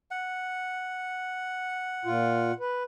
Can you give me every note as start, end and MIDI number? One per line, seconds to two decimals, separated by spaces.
0.11 2.54 78
2.05 2.52 46
2.05 2.52 65
2.60 2.83 71